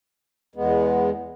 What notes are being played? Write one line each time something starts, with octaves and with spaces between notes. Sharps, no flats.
E2 G#3 B3